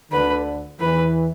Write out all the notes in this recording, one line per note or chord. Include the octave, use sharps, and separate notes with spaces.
D2 D3 B4
E2 E3 B4